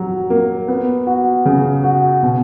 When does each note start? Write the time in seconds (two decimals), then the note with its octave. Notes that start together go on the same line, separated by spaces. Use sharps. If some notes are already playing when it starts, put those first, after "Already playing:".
Already playing: F#3
0.30 A#3
0.68 B3
1.07 F#4
1.45 C#3
1.84 F#4
2.23 B2